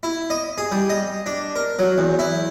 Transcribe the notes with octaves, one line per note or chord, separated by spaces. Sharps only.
E4
D#5
G#4
G3
D#5
D4
A#4
F#3
E2
E4